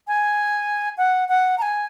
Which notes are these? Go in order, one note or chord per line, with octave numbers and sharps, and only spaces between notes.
G#5
F#5
F#5
A#5
G#5